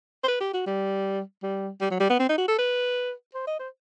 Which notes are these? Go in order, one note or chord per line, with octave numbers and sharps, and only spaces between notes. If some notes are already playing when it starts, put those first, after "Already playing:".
C5
B4
G4
F#4
G3
G3
G3
F#3
G3
B3
C4
D#4
F#4
A4
B4
C5
D#5
C5